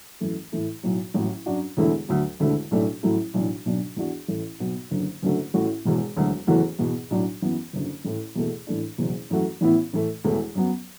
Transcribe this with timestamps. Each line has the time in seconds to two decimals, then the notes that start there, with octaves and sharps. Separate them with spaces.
0.20 F#2 E3 A3
0.52 A2 E3 A3 E4
0.83 B1 A2 F#3
1.14 A1 A2 F#3
1.46 F#2 F#3 D4 F#4
1.77 E1 E2 D3 A3 E4
2.09 D2 D3 F#3
2.40 E1 D2 D3 A3 E4
2.71 B1 A2 A3 D4
3.03 A1 A2 F#3 A3 E4
3.34 B1 A2 E3 D4
3.65 B1 B2 F#3 D4
3.96 E2 E3 D4 F#4
4.28 A1 A2 E3 A3
4.59 B1 B2 B3
4.91 F#1 F#2 D3
5.22 F#1 F#2 D3 A3 F#4
5.54 A1 A2 A3 F#4
5.85 E1 E2 B2
6.16 E1 D2 D3 F#3
6.47 F#1 E2 E3 A3 F#4
6.79 E2 B2 B3
7.10 B1 A2 F#3 D4
7.42 F#2 E3 B3
7.73 F#1 F#2 D3
8.04 A1 A2 A3
8.35 E2 B2 A3
8.67 A2 E3 A3 D4
8.98 F#1 E2 B2
9.30 F#2 E3 A3 F#4
9.61 A1 A2 E3 B3 E4
9.93 A2 E3 A3
10.24 E1 E2 E3 A3
10.55 F#2 F#3 B3